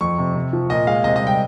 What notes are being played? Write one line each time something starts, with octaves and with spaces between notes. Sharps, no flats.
F2 C#6
C3
C3
F3
A#2 D#5
G#3 F5
C3 D#5
D#5
G3
G5